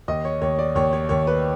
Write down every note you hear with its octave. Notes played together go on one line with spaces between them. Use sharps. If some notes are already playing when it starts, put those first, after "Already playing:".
D#2 D#5
C#5
D#2 C#5
D5
D#2 C#5
C#5
D#2 C#5
B4